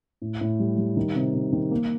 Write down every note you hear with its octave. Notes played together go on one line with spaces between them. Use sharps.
A2
A2
G3
G3
D#3
C3
C3
D#3
A#3